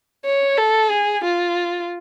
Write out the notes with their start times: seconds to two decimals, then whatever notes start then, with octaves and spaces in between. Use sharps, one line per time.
0.25 C#5
0.57 A4
0.90 G#4
1.24 F4